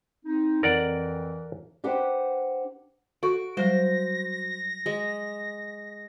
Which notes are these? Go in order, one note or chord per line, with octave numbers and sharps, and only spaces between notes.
C4 D#4
F2 E3 A#4 D5 F#5
D4 G4 B4 C5 F#5
F#4 A4 C#6 D7
F#3 G3 C5 A#6
G#3